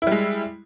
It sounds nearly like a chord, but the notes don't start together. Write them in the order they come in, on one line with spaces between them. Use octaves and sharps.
E4 G3 G#3